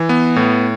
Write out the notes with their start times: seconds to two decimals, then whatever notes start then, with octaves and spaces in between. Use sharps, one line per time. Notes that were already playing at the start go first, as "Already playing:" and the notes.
Already playing: E3
0.09 B3
0.36 A2